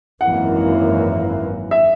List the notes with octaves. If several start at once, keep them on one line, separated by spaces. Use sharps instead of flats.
G#1 F#2 E3 A#3 F#5
E5